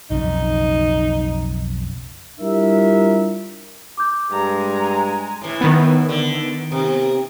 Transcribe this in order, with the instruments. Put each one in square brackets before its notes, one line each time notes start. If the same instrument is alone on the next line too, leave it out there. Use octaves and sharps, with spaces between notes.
[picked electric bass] B1 F2 C#3 [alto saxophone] D#4
[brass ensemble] G3 D4 E4 F4 A#4 E5
[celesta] D6 G6
[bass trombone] G2 [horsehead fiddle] G#3 G#5 [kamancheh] A#5
[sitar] A2 E3
[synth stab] D#3 B3
[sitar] D3
C3